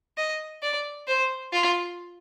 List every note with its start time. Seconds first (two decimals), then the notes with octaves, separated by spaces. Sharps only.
0.17 D#5
0.62 D5
1.08 C5
1.53 F4